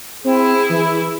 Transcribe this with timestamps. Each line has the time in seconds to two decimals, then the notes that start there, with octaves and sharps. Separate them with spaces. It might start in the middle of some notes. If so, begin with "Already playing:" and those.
0.24 C4 E4 G#4
0.69 E3